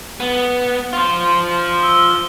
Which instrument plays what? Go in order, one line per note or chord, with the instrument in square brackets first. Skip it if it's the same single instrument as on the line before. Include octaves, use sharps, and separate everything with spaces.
[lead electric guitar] B3
F4 C5
[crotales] E6 G7